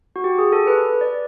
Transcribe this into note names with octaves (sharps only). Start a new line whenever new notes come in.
F#4
G4
G#4
A4
B4
D5